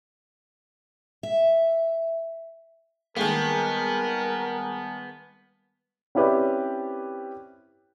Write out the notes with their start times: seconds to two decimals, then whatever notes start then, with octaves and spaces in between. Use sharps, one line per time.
1.23 E5
3.16 D#3 G3 G#3 A#3 B3 A#4 G#5 A5
6.15 C4 C#4 E4 G4 B4 D5